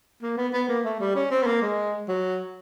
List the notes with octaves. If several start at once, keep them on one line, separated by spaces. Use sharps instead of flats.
A#3
B3
B3
A#3
A3
G3
C#4
C4
B3
A#3
G#3
F#3